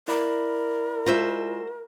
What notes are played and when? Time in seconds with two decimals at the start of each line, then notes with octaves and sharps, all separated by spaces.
0.08 E4 A#4 D5 B5
1.06 G#3 F4 F#4 C5 E5